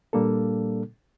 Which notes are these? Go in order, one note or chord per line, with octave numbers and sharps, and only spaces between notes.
A#2 G3 A#3 D4 A4